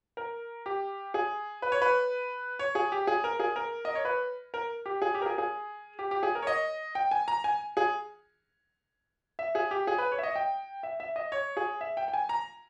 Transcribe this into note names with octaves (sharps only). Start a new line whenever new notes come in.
A#4
G4
G#4
B4
C#5
B4
C#5
G#4
G4
G#4
A#4
G#4
A#4
D#5
C#5
B4
A#4
G4
G#4
G4
A#4
G#4
G#4
G4
G4
G#4
A#4
C#5
D#5
G5
G#5
A#5
G#5
G#4
E5
G#4
G4
G#4
B4
C#5
E5
D#5
G5
E5
E5
D#5
C#5
G#4
E5
G5
G5
G#5
A#5